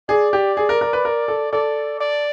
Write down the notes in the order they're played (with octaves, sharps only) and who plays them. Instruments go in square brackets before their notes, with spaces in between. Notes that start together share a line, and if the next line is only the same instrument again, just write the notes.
[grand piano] G#4 [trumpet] D5
[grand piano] G4
G#4
A#4
A#4
B4
A#4
A4
[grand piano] A4 [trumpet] D5
[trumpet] D5